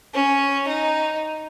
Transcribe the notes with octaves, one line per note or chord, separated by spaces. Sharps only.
C#4
D#4